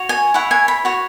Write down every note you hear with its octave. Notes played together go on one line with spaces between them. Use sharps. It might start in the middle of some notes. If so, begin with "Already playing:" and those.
Already playing: F#4 C#5
G#5
E4 C#5 F#5
G#5
B5
F#4 C#5